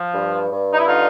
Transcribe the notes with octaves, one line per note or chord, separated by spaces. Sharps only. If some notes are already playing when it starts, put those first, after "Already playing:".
Already playing: F3
G2
G2
D#4
E4
D3 D#4 F4